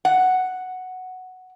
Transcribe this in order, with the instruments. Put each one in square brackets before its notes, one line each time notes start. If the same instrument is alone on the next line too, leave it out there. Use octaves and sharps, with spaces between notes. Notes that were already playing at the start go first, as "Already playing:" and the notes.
[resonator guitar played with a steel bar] F#5